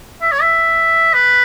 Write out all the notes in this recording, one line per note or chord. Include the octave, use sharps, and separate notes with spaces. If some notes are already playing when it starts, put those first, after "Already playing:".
E5
C#5
E5
B4